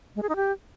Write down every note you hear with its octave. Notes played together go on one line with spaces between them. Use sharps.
G#3
G#4
D#4
G4